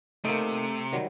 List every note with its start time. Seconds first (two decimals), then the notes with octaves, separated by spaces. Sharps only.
0.25 C3 A3 A#3 D#4
0.92 D#3 F#3 G3